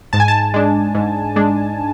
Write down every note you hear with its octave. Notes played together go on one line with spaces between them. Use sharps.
G#2 A5
G#5
A5
G#3 D4
G#2
G#3 D4